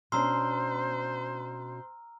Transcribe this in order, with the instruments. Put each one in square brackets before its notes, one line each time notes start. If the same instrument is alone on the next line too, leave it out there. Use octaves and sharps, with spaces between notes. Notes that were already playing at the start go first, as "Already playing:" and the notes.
[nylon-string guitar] B2 C#4 D4 [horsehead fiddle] C5 [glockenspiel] A#5 E6 F6 [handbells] C6